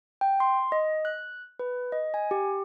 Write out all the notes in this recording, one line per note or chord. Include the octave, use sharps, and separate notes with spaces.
G5
C6
D#5
F#6
B4
D#5
G#5
G4